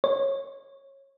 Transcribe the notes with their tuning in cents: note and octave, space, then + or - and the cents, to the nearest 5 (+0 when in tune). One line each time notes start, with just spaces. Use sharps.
C#5 -20